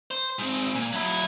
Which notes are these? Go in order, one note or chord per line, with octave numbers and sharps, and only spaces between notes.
C5
G#2 C4
A#2
F#3 E4